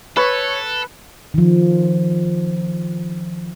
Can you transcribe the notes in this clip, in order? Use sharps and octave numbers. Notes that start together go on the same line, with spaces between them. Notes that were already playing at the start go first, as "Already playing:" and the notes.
A4 B4 C#5
D#3 F3